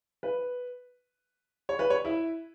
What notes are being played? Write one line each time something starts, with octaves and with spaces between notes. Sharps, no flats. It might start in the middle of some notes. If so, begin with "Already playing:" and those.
B4
C#5
B4
C#5
E4 E5